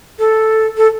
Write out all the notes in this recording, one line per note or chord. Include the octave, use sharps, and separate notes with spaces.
A4
A4